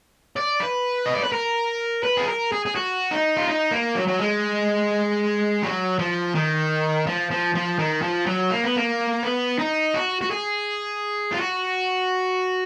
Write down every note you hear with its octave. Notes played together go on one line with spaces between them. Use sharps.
D5
B4
D#5
D5
B4
A#4
B4
G#4
A#4
G#4
G#4
F#4
D#4
F4
D#4
A#3
F#3
F#3
G#3
F#3
F3
D#3
F3
F3
F3
D#3
F3
F#3
A#3
B3
A#3
B3
D#4
F#4
F#4
G#4
F4
F#4